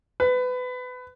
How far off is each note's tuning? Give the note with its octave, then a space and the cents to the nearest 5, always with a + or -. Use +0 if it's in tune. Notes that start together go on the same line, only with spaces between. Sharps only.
B4 +25